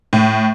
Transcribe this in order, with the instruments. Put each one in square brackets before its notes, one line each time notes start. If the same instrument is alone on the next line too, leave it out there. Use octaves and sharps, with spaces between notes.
[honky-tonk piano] A2